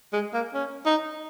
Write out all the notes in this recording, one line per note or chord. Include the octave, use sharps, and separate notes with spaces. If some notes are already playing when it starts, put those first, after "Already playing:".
G#3
A#3
C#4
D#4